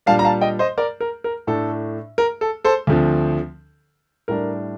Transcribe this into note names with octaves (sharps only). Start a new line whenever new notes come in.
A#2 G3 D4 F5 A5
A#5
F5 A5
D#5 G5
C5 D#5
A#4 D5
A#4
A#4
A2 A3 D4 A4
A#4
A4
A4 C5
D2 D3 F3 C4
A2 G3 D4 A#4